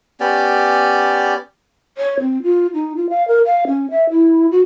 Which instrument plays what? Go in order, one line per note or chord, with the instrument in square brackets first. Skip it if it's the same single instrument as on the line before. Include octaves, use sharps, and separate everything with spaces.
[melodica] B3 C#4 G4 D5
[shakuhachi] C#5
C4
F4
D#4
F4
F5
A#4
F5
C#4
E5
E4
F#4